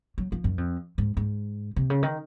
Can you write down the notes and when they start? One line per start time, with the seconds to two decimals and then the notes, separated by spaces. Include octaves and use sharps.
0.18 F#3
0.32 F3
0.44 F#2
0.58 F2
0.98 G#2
1.17 G#2
1.76 C3
1.90 C#3
2.03 D#3